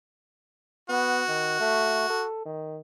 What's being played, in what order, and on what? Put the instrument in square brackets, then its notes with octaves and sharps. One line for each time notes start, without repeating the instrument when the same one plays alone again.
[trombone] B3 [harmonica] F#4
[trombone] D#3
A3
A4
D#3